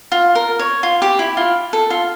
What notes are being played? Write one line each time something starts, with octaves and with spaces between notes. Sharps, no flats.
F4
A#4
C#5
F4
G4
E4
F4
A4
F4